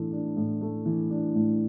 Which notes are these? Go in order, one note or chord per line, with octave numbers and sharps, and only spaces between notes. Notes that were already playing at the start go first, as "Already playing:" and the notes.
Already playing: A2 E3 A3 D4
D4
A2
A3
E3
D4
A2